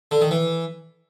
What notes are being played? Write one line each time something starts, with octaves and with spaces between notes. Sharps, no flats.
D3
D#3
E3